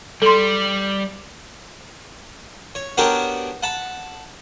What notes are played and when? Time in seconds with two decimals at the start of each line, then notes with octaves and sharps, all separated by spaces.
0.22 G3 A4 C6
2.75 C#5
2.98 B3 D4 F#4 G4 A#4 C#5
3.63 F#5 A5 B5